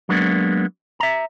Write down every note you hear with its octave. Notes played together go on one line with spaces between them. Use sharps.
F#3 G#3 A#3 B3 D4
E5 A#5